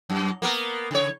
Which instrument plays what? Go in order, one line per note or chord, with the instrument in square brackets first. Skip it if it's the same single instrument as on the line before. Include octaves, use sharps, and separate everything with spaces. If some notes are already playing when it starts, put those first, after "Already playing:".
[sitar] F#2
A#3 B3 A#4
C#3 C#5